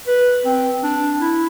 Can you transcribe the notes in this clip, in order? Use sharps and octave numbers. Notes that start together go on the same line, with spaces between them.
B4
C4
D4
E4